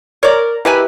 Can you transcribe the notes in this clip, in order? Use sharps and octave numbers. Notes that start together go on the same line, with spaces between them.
A#4 C#5 D5
B2 E4 G4 A#4 B4 G#5